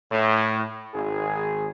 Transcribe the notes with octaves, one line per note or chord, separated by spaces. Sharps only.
A2
G#1 G#4